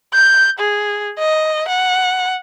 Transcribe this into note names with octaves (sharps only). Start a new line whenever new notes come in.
G6
G#4
D#5
F#5